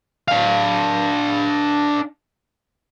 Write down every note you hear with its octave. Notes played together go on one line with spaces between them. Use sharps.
D4 F5